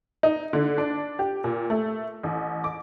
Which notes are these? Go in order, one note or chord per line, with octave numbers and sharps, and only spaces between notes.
D#4
D3
D4
G4
A#2
A3
A1
D6